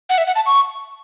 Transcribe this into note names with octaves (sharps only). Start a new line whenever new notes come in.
F#5
E5
F#5
A5
C#6